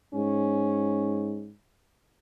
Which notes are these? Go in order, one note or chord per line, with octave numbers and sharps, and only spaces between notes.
G#2 C#4